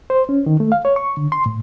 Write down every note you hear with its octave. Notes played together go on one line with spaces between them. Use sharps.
C5
C#4
D#3
A3
F5
C#5
C#6
D3
C6
A2